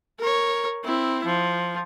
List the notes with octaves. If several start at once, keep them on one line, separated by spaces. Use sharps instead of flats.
A#4 C#5
C4 E4
F3